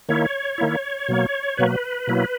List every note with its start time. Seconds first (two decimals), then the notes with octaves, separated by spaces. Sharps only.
0.09 D#3 A#3 E4 C#5
0.58 D#3 A#3 E4
1.08 B2 F#3 A#3
1.57 B2 F#3 A#3 B4
2.07 B2 F#3 A#3 E4